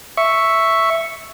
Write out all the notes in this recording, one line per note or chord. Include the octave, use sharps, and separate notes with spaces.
E5 C#6